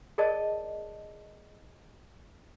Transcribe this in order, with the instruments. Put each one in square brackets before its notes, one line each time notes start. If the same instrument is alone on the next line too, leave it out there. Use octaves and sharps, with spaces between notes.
[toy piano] G#4 A#4 D5 D#5 A5